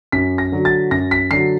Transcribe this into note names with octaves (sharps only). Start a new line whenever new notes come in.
F#2 B6
A#6
D3 F#3
A6
F#2 A#6
B6
D3 F#3 C7